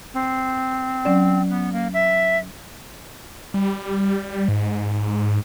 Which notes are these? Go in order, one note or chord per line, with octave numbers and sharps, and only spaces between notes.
C4
F#3 C#4 D5
B3
A#3
E5
G3
G#2